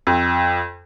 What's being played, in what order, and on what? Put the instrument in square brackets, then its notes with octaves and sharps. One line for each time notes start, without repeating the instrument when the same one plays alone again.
[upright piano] F2